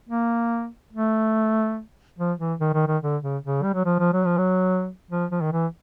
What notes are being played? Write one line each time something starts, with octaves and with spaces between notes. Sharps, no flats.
A#3
A3
F3
E3
D#3
D#3
D#3
D3
C#3
C#3
G3
F#3
F3
F3
F#3
F3
F#3
F3
F3
D#3
E3